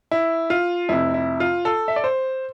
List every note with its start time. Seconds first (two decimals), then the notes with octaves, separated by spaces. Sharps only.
0.11 E4
0.50 F4
0.89 F1 F2 C3 E4
1.14 E4
1.40 F4
1.65 A4
1.88 E5
1.96 D5
2.04 C5